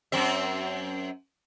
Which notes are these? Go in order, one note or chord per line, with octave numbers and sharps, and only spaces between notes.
F#2 C4 E5